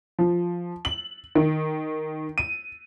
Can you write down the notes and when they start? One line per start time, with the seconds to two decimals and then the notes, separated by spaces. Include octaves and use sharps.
0.19 F3
0.85 F#7
1.35 D#3
2.38 D#7